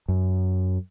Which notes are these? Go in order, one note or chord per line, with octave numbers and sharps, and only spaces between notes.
F#2